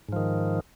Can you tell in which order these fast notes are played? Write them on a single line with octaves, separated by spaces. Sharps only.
G#2 F3 D#3